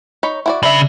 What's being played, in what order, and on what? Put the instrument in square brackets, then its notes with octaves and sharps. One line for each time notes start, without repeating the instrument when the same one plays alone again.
[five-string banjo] D#4 C#5 B5
E4 F#4 D5
[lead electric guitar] C#3 B5 [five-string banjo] D4 D5 E5